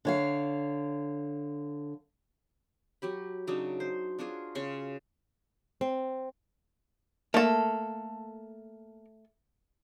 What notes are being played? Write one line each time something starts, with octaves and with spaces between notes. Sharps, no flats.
D3 C#5 F5
F#3 G4 B5
C#3 F#3 D4 D#4
C5
D4 F4 F#4 G#4
C#3 C#4 C6 C#6
C4
A3 A#3 A4